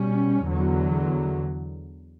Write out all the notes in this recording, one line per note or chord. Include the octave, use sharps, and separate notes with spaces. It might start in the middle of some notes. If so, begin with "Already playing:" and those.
Already playing: B2 G3 C#4
E2 D3 F#3